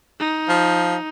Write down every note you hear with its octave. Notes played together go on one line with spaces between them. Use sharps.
D#4
F3